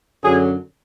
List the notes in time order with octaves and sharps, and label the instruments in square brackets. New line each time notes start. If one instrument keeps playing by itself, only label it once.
[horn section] F#2 D3 F#3 G#4